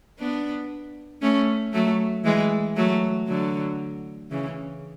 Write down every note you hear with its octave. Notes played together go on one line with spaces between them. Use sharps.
B3 D4
A3 C#4
F#3 A3
E3 G#3
F#3 A3
D3 F#3
C#3 E3